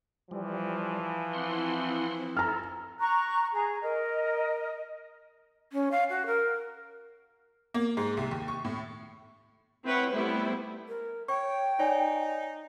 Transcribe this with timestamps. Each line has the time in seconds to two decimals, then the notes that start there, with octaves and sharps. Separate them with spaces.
0.31 E3 F3 G3
1.33 C4 E4 F#5 C6
2.37 E4 A4 A#5 F6
3.00 A#5 C#6 F#6
3.52 G#4 A#5
3.81 A#4 D#5
5.72 C#4
5.91 F5
6.10 F#4
6.26 A#4
7.74 A#3
7.97 G#2
8.17 C2
8.31 D#2
8.48 C#6
8.65 A2
9.84 C4 E4 B4 C#5 F#5
10.13 G3 A3 B3 E4 C5
10.88 A#4
11.28 C#5 G5 C#6
11.80 D#4 C#5 D5 G#5